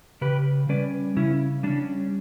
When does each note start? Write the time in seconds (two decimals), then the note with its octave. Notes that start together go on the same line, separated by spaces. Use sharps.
0.21 C#3 G4 B4
0.69 G3 C#4 B4 D5
1.16 C#3 C#4 E4
1.63 G3 C#4 D4